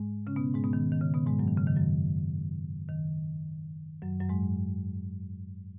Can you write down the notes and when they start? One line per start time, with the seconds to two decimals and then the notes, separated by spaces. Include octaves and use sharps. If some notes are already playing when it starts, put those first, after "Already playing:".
Already playing: G#2 G#3
0.27 C#3 C#4
0.36 B2 B3
0.55 G#2 G#3
0.64 B2 B3
0.73 D#3
0.92 D#3
1.01 C#3
1.14 B2 B3
1.26 G#2 G#3
1.39 F#2 F#3
1.48 D#3
1.58 C#3
1.67 D#3
1.76 F#2 F#3
2.89 D#3
4.02 F#2 F#3
4.20 F#2 F#3
4.29 G#2 G#3